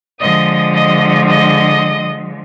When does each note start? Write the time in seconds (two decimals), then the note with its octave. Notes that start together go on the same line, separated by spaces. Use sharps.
0.20 D3 F3 G#3 D#5 D#6
0.74 D#5 D#6
1.27 D#5 D#6